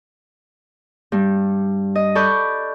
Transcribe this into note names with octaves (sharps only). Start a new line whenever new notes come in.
G2 G3
D#5
A4 D5 B5 C#6 F#6 G6